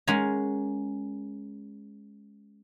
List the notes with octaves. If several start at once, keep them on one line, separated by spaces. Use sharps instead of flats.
G#3 C#4 A#4 F#5 G#5 A#5